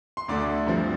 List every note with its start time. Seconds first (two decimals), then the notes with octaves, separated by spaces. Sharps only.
0.17 C6
0.28 D2 D3 A3 D5 D6
0.67 G2 F3 C4